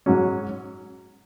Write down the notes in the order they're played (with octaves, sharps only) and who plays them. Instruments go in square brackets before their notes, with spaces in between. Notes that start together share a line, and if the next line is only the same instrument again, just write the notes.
[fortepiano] G#2 F#3 C#4